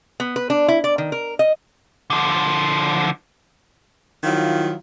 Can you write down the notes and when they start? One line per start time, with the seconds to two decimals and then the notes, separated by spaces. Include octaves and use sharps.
0.20 B3
0.36 B4
0.50 D4
0.68 E4
0.84 D5
0.98 D#3
1.12 A#4
1.39 D#5
2.10 D3 F3
4.24 D#3 F3 F#3 E4 F4